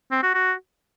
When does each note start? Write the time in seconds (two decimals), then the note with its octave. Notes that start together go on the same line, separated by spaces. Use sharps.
0.12 C4
0.23 F#4
0.34 F#4